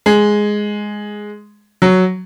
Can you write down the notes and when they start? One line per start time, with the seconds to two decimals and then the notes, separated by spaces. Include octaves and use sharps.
0.06 G#3
1.82 F#3